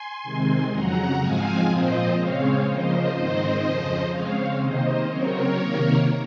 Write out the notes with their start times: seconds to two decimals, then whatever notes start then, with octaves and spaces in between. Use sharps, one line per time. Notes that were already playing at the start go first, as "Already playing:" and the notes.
Already playing: G#5 C6
0.23 C3 D#3 G#3 C4
0.71 F2 C#3 F#3 F#5 A#5
1.20 G#2 F3 G#3 C4 F5 G#5
1.69 A#2 F3 C4 C5 D#5
2.17 C#3 G#3 C4 C#5 F5
2.66 C#3 F3 A#3 C5 D#5
3.15 G#2 D#3 G#3 C4 C5 D#5
3.63 F2 C#3 F3
4.11 C#3 G#3 C4 C#5 F5
4.60 C3 D#3 A#3 C5 D#5
5.08 C#3 F#3 C4 A#4 C#5
5.57 C3 D#3 A#3